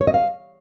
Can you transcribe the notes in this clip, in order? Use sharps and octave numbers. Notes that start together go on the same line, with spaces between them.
C#5
D#5
F5